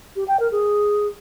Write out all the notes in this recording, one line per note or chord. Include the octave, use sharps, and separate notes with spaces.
G4
G5
A#4
G#4